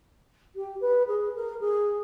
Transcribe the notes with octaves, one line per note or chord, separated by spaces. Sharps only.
G4
B4
G#4
A#4
G#4